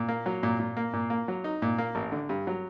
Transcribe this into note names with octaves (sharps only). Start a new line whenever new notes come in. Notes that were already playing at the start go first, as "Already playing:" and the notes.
Already playing: A#2
A#3
F#3
A#2
A#2
A#3
A#2
A#3
F#3
D#4
A#2
A#3
A1
D3
G2
F#3